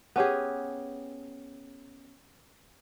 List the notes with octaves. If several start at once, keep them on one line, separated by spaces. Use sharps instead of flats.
B3 C#4 G4 G#4